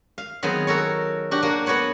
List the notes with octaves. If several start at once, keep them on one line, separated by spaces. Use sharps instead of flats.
F5
D#3 F#3 B3 C4 G#4
F#4 A4 A#4 C#5
D4 F#4 G4
F#3 A#3 F#4 A#4
B3 F#4 B4 C#5 F#5